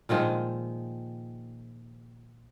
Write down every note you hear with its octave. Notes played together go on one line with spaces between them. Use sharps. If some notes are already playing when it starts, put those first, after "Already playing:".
A#2 D#3 F3 G#3